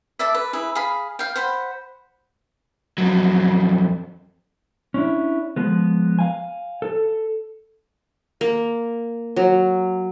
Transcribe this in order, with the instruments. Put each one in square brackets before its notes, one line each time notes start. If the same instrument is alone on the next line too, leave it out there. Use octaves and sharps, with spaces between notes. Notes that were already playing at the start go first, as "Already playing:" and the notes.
[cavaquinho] A4 D5 E5
B4
E4 G#4 B4
G#4 F5 B5
F5 G5
C5 F#5 B5
[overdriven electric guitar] F2 F#3
[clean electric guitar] C#4 D4 E4
F3 G#3 B3
F5 G#5
A4
[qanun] A#3
F#3